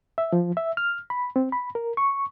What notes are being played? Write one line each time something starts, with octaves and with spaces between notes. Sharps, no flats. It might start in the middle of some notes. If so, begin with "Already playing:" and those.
E5
F3
E5
F6
B5
C4
B5
A#4
C#6